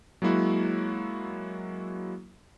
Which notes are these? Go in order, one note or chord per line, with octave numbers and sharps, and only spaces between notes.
F#3 G#3 A#3 E4 F#4